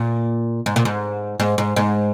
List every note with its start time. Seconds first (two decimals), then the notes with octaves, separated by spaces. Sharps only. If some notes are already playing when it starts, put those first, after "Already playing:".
Already playing: A#2
0.66 G#2
0.76 A#2
0.85 G#2
1.40 G#2
1.58 G#2
1.76 G#2